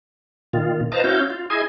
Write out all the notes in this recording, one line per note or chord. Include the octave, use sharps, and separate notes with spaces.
A#2 D#3 F4
B4 C5 D#5 F5 A5 A#5
C#4 E4 F#4 F5 G6
F4
E4 G#4 D#5 G#5